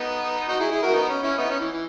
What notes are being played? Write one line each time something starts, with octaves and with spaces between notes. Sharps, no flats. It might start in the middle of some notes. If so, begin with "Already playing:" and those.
Already playing: B3 D#4
D#4 F#4
E4 G#4
E4 G#4
F#4 A#4
B3 D#4
C#4
C#4 E4
B3 D#4
C#4
E3
E3